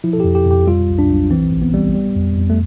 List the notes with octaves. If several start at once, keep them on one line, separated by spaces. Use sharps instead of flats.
F3 E4
A4
F2 G4
G4
F2 G4
G3 F4
B1
D4
B1
E3 C4
A1
B3
G3
G3
F2
F2
A3